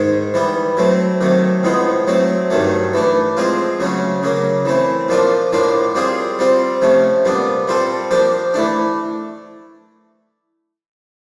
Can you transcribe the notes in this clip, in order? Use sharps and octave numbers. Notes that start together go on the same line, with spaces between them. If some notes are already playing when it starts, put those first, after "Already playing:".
Already playing: G#2 D#3 G#3
E3 G3 B3
F#3 A3 C4
C3 D#3 F#3 A3
A2 F3 G#3 B3 D#4
F#3 A3 C4
G2 D#3 F#3 A3
E3 A3 D4
F3 G#3 C4 F4
C#3 F#3 A3 C#4
C#3 F#3 A#3
E3 A3 C4
A#2 F3 A#3 D4 F4
A2 F3 A#3 D4 F4
G3 C4 F4 G#4
G3 C4 F4
C3 F3 A3 C#4
A#2 G3 B3 D4
G3 C4 F4 A4
F3 A#3 D4 G4
E3 A3 D4